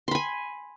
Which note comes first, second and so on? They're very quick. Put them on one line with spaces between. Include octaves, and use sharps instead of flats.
C6 B5 G#5